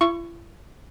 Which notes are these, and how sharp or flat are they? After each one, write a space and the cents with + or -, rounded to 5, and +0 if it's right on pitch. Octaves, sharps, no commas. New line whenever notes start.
E4 +45 C#6 +0